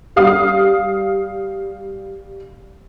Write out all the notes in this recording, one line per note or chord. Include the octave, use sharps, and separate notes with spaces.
G3 F5 D#6